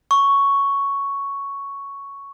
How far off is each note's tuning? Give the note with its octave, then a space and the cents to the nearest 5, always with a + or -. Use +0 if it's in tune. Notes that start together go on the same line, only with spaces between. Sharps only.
C#6 +5